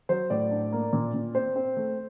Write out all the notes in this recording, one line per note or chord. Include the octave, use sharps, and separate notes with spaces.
F#3 C5
A2 D5
D4
A#3
A#2
A#2
C4 C5
C4
A3